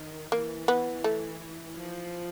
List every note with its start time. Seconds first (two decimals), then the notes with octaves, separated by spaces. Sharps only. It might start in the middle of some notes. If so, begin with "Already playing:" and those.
Already playing: D#3
0.32 E3 A#3
0.68 B3
1.04 A3
1.77 F3